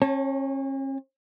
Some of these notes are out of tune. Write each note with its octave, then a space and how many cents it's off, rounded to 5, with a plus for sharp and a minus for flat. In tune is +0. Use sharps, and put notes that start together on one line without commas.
C#4 -40 C#5 +0 A5 +0